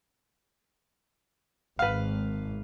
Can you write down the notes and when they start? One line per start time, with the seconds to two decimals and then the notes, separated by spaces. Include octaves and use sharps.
1.79 G#1 B4 F5